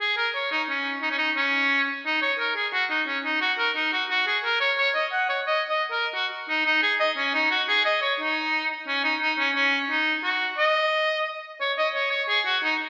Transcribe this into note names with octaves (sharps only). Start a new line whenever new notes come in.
G#4
A#4
C#5
D#4
C#4
D#4
C#4
D#4
C#4
D#4
C#5
A#4
G#4
F#4
D#4
C#4
D#4
F#4
A#4
D#4
F#4
F#4
G#4
A#4
C#5
C#5
D#5
F#5
C#5
D#5
D#5
A#4
F#4
D#4
D#4
G#4
D#5
C#4
D#4
F#4
G#4
D#5
C#5
D#4
C#4
D#4
D#4
C#4
C#4
D#4
F#4
D#5
C#5
D#5
C#5
C#5
G#4
F#4
D#4